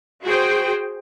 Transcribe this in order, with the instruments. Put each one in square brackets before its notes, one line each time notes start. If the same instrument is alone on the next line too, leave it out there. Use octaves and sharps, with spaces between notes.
[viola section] F#4 G#4 C5 G5